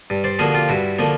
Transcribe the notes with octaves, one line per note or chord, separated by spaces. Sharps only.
G2
C5 D5
D3 F3 A#3 F#4 G#4
F4 G4
G2 E4 F#4
D3 F3 A#3